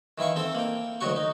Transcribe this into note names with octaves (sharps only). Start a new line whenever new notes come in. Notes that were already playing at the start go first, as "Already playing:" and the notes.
D#3 E3 E4 F5 C#6
C4 A4
A#3 G5
D2 D#3 F#3 F#4 C#6
D#4